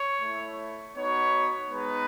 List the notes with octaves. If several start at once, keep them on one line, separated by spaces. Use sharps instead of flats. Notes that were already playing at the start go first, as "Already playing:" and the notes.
Already playing: C#5
A3 E4
B3 D#4 F#4 C#5
G#3 B3 D#4 B4